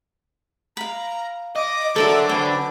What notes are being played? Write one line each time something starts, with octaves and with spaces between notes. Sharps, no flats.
F5 A#5 B5
D#5 D6
D3 F#3 D4 A4 A#4 C5 E5
A4 B4 C5 D5 G5 G#5